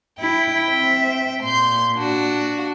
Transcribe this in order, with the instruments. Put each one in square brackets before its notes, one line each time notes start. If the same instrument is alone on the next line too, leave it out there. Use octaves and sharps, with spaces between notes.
[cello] E4 [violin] G5
[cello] C4 E5
[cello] A#2 [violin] C6 G6
[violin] D4 F#4